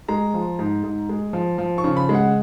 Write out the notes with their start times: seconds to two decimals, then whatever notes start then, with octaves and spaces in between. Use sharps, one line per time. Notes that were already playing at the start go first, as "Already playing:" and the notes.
0.08 G#3 A#5
0.34 F3
0.59 G#2
0.84 G#2
1.09 G#3
1.33 F3
1.58 F3
1.78 C#6
1.84 C#3
1.96 B5
2.09 G#3
2.15 F#5